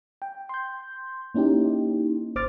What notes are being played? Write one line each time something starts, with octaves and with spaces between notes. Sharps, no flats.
G5
C6 G6
A#3 C#4 D#4 E4 G4
G1 C5 D6 F6 A6